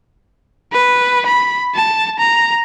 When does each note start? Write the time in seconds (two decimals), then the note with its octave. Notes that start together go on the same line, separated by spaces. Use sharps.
0.73 B4
1.26 B5
1.75 A5
2.19 A#5